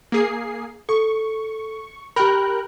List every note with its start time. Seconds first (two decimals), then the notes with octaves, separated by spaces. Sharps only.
0.12 A#3 G#4 C7
0.89 A4 C#6
2.16 G4 A#4 G5 B5 F#6